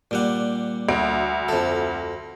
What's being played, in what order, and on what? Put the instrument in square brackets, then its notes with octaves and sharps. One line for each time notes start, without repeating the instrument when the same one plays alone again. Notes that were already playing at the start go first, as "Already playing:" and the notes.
[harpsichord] A#2 G3 F#5
[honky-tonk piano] D2 D7
[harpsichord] F2 A4